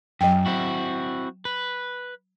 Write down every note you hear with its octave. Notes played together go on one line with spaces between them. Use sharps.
F#2 F#3 G5
C4 E4 F#4
B4